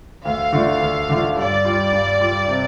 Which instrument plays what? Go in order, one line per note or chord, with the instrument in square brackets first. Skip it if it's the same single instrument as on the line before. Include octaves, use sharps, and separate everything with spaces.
[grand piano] D2 [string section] F5
[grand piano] D3 A3 D4 F4
D2
D3 A3 D4 F4
[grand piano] G2 [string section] D5
[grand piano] G3 F4
G2
G3 F4
C3